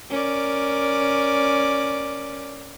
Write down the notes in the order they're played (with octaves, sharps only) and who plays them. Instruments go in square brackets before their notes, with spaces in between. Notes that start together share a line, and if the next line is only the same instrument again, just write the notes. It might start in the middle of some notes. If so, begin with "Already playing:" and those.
[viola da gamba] C#4 A#4 D5